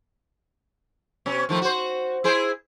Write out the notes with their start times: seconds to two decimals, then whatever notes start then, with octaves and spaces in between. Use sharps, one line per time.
1.26 B2 C#4
1.49 D#3 F3 A3
1.62 F#4 C5
2.24 E4 G#4 C5